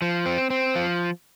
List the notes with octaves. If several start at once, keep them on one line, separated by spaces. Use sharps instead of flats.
F3
C4
C4
F3